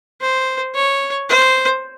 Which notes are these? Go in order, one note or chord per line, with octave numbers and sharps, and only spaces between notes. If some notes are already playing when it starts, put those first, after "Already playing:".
C5
C#5
C5